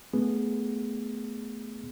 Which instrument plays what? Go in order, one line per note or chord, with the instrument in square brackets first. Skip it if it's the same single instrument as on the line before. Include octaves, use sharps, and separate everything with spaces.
[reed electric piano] A3 B3 G#4